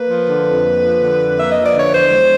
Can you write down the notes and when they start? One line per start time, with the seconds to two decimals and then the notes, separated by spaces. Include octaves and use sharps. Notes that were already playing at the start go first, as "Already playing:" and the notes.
Already playing: A#3 B4
0.08 F3
0.28 D3
0.45 F2
0.64 A#3
0.82 F3
1.00 D3
1.19 F2
1.38 A#3 E5
1.51 F3 D#5
1.65 D5
1.73 D3 C#5
1.92 E2 C5
2.11 G#3